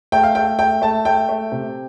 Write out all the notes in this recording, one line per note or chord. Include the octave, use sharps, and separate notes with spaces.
A3 G5
F5
A3 G5
A3 G5
A3 A5
A3 G5
A3
C3